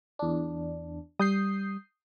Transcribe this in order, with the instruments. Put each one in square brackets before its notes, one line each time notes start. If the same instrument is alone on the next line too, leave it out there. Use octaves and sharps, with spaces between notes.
[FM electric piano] E2 D4
[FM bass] G3 [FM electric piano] D#6 G6 C7